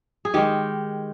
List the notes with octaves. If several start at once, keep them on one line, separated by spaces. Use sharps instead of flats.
G#4
D#3 G#3 G4